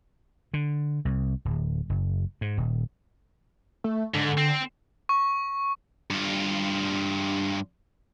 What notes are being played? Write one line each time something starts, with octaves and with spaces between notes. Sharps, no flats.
D3
C2
D1
F#1
G#2
D#1
A3
G#2 D3
C4
C#6
G2 F4